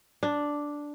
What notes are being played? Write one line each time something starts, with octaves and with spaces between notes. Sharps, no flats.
D4